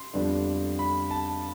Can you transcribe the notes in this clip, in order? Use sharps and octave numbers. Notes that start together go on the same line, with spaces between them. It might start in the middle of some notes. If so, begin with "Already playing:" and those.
Already playing: C6
F2 D3 G3 B3 D4
B5
A5